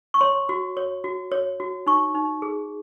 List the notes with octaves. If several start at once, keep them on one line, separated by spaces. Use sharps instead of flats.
C#6
C#5 C6
F#4
C#5
F#4
C#5
F#4
D#4 C#6
D#4
G#4